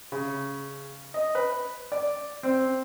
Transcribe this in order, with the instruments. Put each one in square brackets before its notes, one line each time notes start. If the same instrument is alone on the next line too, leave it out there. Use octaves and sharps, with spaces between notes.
[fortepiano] C#3
D#5
B4
D5
C4